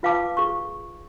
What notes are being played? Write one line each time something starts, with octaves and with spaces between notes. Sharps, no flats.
F4 B4 F5 G5 A5 D6
G#4 C#6